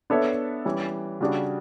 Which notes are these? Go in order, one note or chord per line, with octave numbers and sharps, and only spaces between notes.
B3 D4 A4 C#5 E5
E3 G3 C#4
C#3 G3 D4 F#4